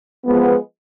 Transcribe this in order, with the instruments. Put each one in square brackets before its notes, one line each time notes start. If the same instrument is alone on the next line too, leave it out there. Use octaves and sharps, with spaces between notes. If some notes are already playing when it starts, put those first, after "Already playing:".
[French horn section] F3 G#3 B3